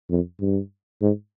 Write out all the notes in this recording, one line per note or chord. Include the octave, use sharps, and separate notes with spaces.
F2
G2
G#2